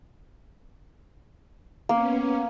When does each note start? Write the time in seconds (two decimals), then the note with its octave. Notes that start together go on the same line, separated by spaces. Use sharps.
1.89 A#3 B3 C#4